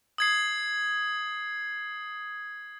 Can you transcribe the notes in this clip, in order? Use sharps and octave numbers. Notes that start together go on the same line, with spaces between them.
D#6 G#6 C7